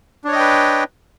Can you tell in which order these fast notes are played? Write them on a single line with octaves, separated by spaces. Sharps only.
D4 C#5 D#5 G5 B4